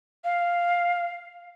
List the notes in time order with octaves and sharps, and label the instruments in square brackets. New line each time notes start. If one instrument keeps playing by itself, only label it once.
[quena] F5